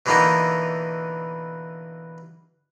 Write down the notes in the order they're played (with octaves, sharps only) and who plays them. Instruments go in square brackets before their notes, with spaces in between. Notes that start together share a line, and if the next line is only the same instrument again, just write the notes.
[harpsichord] B2 D3 E3 A#3 B3 D#4